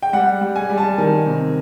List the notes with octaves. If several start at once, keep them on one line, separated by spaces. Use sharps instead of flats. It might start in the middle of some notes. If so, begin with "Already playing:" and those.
G5
G3 F#5
G3
G#5
G3
A5
D#3 G#5
C3